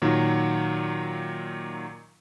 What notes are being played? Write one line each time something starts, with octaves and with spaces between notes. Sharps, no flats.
A#2 D#3 F#3